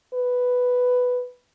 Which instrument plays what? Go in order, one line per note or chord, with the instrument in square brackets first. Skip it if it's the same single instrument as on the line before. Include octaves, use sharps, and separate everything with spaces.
[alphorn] B4